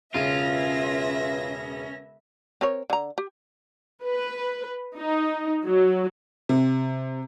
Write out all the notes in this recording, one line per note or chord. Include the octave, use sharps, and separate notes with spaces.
E1 C#3 C#4 F4 B4 E5 A#6 D#7
C4 A#4 C#5
D3 A#5
G4
B4
D#4
F#3
C3